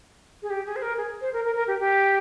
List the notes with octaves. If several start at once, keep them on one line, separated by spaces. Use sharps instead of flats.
G#4
G4
G#4
C5
A#4
G#4
C5
A#4
A#4
A#4
G4
G4